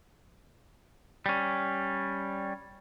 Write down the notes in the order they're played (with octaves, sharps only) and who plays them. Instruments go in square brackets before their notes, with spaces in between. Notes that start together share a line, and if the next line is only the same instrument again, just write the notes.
[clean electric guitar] G3 C#4